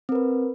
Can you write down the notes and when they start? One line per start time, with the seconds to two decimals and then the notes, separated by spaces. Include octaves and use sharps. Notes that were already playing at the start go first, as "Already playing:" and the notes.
0.09 C4
0.12 A#4
0.15 B4